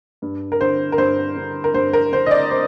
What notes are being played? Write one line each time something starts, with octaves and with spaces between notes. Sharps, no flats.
G2
A#4
D3 C5
A#4
G2 C5
D3
A#4
G2 C5
A#4
D3 C5
D#5
D5
C5